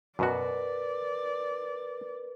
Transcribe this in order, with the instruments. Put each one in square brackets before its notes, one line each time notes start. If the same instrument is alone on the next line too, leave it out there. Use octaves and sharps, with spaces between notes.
[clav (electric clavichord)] F#2 B2 F#4 [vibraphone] A#4 B4 [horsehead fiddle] D5